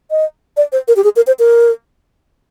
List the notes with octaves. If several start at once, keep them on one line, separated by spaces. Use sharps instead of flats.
D#5
D5
C5
A#4
G4
G#4
A#4
C5
A#4